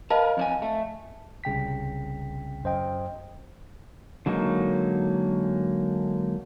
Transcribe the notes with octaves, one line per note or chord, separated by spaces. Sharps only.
A#4 B4 D#5 F5 A5
F2 D4 G#5
A3
C2 C#3 G5 B6
F#2 C5 D#5 G5
D3 F#3 G#3 A#3 D#4